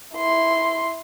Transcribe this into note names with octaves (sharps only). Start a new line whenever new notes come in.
E4 C6